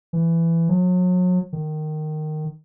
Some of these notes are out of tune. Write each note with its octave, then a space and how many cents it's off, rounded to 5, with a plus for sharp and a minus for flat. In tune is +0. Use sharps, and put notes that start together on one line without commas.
E3 +15
F#3 -35
D#3 -15